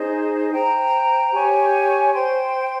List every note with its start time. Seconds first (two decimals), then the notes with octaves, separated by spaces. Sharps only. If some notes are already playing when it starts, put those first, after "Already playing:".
Already playing: D#4 G#4 C5
0.51 C5 G5 A#5
1.32 G4 C#5 G#5 C#6
2.14 C5 G5 C6